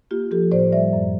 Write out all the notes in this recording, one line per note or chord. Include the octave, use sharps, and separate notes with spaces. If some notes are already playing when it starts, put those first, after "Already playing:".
A#3 F4 G4
F3 G4 A4
A2 C5 D5
G3 D5 E5
F#2